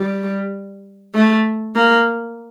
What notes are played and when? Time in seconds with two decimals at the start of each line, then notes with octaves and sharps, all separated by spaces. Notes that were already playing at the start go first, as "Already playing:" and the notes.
Already playing: G3
1.15 A3
1.75 A#3